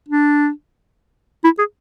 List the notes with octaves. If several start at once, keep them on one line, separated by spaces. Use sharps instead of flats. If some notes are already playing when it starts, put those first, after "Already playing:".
D4
E4
G#4